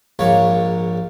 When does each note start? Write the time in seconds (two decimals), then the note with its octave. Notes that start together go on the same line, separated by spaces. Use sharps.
0.19 A#1 G#2 A#3 C#5